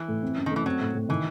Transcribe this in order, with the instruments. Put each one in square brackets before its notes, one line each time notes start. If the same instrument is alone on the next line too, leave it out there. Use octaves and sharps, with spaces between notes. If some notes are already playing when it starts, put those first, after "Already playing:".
Already playing: [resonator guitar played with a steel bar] E3
[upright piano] A2
C4
F#2
[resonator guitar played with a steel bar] D#3
[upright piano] A3
[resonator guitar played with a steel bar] E3
[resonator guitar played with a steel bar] F#3 [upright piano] C4
[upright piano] A2
A2
[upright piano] D#3 [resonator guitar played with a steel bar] E3